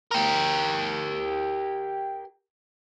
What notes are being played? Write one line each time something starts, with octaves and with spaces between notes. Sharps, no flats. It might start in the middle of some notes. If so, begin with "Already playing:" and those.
G4 A#4